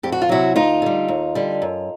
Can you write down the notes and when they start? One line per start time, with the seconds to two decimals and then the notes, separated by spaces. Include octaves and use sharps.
0.03 F2 G4
0.12 F#4
0.22 F4
0.29 C3 D#3 F#3 E4 F#4
0.56 D2 D#4 F4
0.82 D3 G3
1.08 D#2
1.35 D3 G3
1.62 F#2